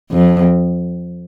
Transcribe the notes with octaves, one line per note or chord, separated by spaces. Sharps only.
F2